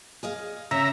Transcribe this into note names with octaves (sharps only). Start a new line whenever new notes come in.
G#4 D#5 F5
C#3 E5 A#5